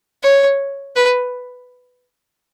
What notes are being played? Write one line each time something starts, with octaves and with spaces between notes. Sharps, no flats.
C#5
B4